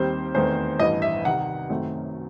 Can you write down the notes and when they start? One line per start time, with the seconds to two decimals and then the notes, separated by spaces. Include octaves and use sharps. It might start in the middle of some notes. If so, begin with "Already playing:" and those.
Already playing: D#2 D#3 G3 C4 C5
0.34 E2 D#3 A3 C4 C5
0.80 A1 G2 E3 D#5
1.02 E5
1.25 C2 C3 D#3 F#5
1.70 F#2 D#3 A3 C4